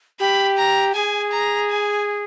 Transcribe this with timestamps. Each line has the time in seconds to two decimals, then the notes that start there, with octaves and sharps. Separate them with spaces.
0.20 G4 B5
0.57 A#5
0.95 G#4 G#5
1.32 A#5
1.70 G#5